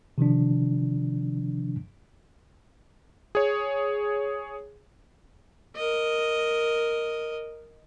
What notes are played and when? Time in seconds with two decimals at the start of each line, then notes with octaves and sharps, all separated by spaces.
0.18 C3 D#3 F3 D4
3.35 G#4 C#5
5.76 A#4 D#5